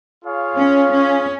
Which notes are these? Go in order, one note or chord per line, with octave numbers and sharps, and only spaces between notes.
F4 G#4 C#5 F5
C#4
C#4